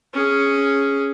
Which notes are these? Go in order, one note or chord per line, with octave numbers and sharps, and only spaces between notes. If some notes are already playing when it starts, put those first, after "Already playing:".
C#4 G#4